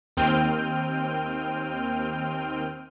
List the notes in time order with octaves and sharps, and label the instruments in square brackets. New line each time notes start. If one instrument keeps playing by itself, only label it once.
[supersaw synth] D#2 C4 G5 F6 G6 D#7